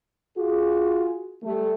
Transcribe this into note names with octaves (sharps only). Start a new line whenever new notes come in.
F4 F#4 G#4
G3 A3